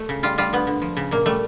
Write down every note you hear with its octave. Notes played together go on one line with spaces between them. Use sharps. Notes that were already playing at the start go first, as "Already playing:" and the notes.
Already playing: A3
C#3
G3 F4
G3 F4
D3 B3
D3
F3
C#3
A#2 A#3
G3 A3